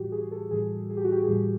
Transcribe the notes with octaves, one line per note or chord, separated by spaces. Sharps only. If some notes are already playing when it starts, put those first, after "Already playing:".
Already playing: A2 E3 G3 F#4 G4
G#4
A4
A2 E3 G3 G#4
G#4
G4
F#4
G4
G#4
A2 E3 G3 G4